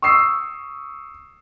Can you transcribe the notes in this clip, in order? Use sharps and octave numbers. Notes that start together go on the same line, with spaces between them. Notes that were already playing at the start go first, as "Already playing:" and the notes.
C#6 D#6 E6 C7